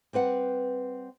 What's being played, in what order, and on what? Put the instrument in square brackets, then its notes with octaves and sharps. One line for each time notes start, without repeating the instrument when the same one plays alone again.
[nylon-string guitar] G3 C4 B4 F#5